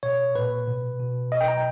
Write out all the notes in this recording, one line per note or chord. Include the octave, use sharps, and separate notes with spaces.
B2 C#5
A#2 B4
B2
B2
B2 D#5
G5
A#5